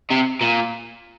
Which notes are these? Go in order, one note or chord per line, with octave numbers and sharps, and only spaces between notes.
C3
A#2